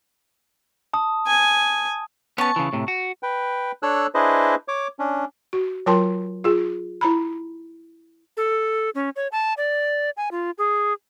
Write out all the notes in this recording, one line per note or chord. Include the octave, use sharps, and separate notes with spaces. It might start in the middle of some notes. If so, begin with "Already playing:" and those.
A5 D#6
G#5
B3 C#4 A5 C#6
C#3 E3
A2 C3
F#4
B4 G5
D4 A4 C#5 E6 F#6
D4 E4 G#4 B4 C5 D#5
C#5 D6
C#4 D4
F#4
F#3 F4 A#4 G5 A5 C6
F4 G#4
E4 A#5 B5
A4
C#4
C#5
A5
D5
G#5
F4
G#4